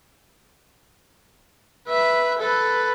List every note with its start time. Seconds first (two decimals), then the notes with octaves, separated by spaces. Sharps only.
1.88 B4 E5
2.39 A4 B4